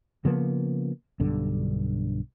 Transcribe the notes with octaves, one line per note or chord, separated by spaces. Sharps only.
C#3 F3 A#3 B3
B1 G2 D3